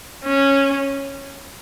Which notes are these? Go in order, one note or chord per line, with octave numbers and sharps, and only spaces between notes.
C#4